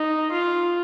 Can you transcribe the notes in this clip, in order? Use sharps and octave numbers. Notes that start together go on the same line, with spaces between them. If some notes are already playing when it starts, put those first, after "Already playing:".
Already playing: D#4
F4